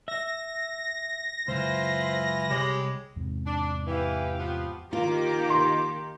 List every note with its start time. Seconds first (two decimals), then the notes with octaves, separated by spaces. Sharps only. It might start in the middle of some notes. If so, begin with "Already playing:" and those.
0.08 E5 A#6
1.48 C#2 F#2 E3 E4 F4 C5
2.50 C2 G#3 G4 C#5 B5
3.16 E2 G#2 C3
3.46 D4
3.87 E3 G4 F5
4.38 F3 B3
4.93 D#3 A#3 F4 G4 D6
5.50 C6